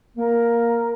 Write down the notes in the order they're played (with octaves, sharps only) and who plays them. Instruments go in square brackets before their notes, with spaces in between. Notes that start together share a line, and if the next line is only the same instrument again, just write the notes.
[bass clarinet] A#3 [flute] A#4